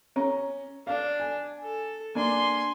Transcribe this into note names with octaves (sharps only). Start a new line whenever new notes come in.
C#4 A#5
D4 F5
G#5
A4
A#3 D4 G#5 C6